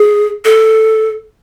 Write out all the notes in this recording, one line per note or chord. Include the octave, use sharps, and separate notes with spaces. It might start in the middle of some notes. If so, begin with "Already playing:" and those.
Already playing: G#4
A4